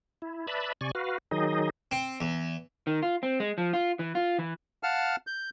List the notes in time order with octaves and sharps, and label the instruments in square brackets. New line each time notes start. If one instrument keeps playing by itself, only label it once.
[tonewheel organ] E4
B4 D5 E5 A5 B5
C3 D5 G#5 C#6
F#4 B4 F5
D#3 F#3 D#4 G#4 D#5
[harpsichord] C4
E2
[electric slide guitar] D#3
F4
C4
G#3
F3
F4
E3
F4
E3
[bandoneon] F5 F#5 A5 F6
G6